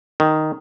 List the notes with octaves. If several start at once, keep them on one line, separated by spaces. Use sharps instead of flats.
D#3